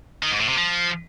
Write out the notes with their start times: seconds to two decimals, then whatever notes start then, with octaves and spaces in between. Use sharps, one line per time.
0.23 D#3
0.32 G#2
0.40 A2
0.49 C3
0.57 F3